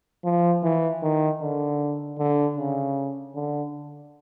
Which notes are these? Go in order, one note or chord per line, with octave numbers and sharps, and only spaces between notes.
F3
E3
D#3
D3
D3
C#3
D3